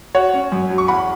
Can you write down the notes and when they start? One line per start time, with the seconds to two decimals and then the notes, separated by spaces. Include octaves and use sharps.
0.15 F#4 C#5 F#5
0.34 C#4
0.52 F#2
0.70 F#3
0.78 C#6
0.88 E2 F#5 B5